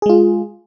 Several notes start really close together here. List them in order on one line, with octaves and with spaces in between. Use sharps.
G#4 G#3 F4